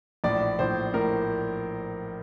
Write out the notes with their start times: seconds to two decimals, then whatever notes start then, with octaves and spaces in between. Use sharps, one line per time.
0.24 A#1 A2 D5
0.59 A#1 A2 C5
0.94 A2 A#4